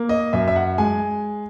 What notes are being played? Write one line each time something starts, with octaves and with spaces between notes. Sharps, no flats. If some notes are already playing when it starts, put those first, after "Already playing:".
Already playing: A#3
D#5
F#2 E5
E5
F#5
G#3 G#5